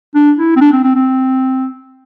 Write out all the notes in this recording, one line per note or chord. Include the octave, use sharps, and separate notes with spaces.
D4
E4
C4
D4
C4
C4
C4